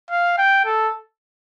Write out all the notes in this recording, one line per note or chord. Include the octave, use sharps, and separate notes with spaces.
F5
G5
A4